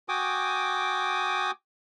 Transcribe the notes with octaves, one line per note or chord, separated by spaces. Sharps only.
F#4 G5 G#5 D6 D#6